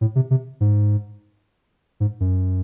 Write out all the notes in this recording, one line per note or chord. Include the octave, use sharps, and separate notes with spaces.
A2
C3
C3
G#2
G#2
F#2